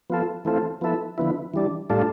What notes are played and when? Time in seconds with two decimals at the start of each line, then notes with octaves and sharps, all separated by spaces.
0.10 F3 B3 F4 A4
0.45 E3 A3 C4 F4 A4
0.81 F3 B3 E4 A4
1.18 D3 F3 B3 E4
1.54 E3 G3 D4
1.90 A2 G3 D4 F4 A4